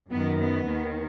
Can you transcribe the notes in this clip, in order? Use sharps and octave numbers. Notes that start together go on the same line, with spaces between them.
F#2 D#3 B3
B3
D#2 D#3